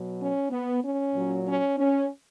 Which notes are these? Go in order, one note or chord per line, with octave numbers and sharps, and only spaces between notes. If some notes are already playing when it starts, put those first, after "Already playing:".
Already playing: B2 F#3
C#4
B3
C#4
A#2 F#3
C#4
C#4